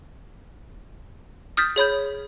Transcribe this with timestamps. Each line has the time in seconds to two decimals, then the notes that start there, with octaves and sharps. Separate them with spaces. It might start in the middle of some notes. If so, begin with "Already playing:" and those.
1.57 D#6 F6 G6 A6 B6
1.76 G#4 C#5 B5 G6